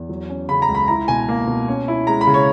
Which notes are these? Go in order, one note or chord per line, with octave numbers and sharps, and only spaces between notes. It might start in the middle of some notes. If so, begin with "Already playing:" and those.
Already playing: E2
F#3
C#4
C#3 B5
A#5
C#2
B5
E4 A#5
B2 G#5
A#3
B2
C#4
E4
G#3 A#5
B5
C#3
C#5